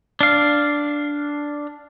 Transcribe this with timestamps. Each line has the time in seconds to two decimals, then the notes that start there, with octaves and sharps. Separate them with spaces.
0.21 D4 F5